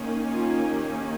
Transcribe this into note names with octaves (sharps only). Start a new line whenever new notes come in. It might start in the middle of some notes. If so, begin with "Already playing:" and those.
Already playing: D#3 A#3 C#4
F4
G4